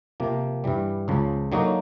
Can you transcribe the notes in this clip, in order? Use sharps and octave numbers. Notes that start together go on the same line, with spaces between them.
C3 F3 A#3
G2 E3 G3
C#2 C#3 F3
D3 F#3 A#3 D#4 F#4